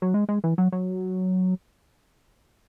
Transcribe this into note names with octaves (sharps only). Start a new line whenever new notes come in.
F#3
G#3
G#3
E3
F#3
F#3